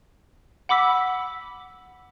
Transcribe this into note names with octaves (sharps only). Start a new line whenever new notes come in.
F#5 B5 D6 E6 B6